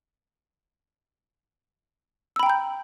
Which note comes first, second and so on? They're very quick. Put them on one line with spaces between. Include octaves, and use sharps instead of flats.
E6 B5 G5 A#5 G6